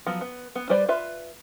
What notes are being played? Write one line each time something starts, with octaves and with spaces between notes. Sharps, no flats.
F3 F#3 B3
B3
B3
G3 B4 C5 D5
F4 B4 E5